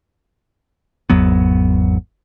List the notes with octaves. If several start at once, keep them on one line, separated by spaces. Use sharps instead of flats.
G#1 E2 F#3 B3